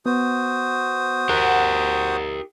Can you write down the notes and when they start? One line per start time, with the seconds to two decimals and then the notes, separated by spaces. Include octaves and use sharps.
0.06 B3 F#4 C5 D#6
1.29 G4 A#4 F#5